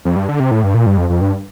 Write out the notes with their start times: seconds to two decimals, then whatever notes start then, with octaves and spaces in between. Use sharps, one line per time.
0.05 F2
0.16 G2
0.29 D3
0.40 C3
0.51 A2
0.63 G2
0.74 A#2
0.86 G2
0.97 F2
1.10 F2
1.21 G2